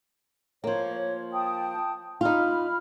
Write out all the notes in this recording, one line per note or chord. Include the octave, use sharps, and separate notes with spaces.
F3 A#3 C#5
G5 A5 D#6
D#4 F4 B5 F6